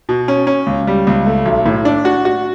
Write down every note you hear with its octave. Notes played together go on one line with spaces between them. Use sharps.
B2
C#4
C#4
C#2
G3
C#2
A3
B1
A2
D4
F#4
F#4